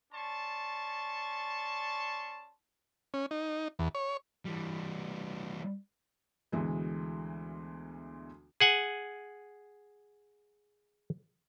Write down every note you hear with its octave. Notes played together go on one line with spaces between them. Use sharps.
C#4 D5 A5 C6 C#6
C#4
D#4
E2
C#5
E3 G3
D2 B2 E3 G#3
G#4 F#5 G#5